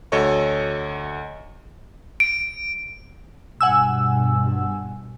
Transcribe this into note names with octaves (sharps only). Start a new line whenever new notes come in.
D2 F#4 A4 C#5 D#5 C#6
D7
G2 B2 F#5 G#5 E6